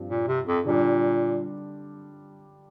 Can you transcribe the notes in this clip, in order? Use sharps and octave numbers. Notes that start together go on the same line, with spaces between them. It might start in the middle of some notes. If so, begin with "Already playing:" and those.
Already playing: G2 F3 C4
A#2
C3
F2
A#2 D3 G3 D4